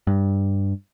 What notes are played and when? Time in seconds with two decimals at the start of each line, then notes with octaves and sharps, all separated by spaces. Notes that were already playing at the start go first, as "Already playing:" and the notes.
0.07 G2